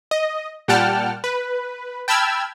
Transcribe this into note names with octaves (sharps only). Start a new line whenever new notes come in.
D#5
A#2 G3 F#5 G5 A5 F6
B4
G5 A5 B5 E6 F6 G#6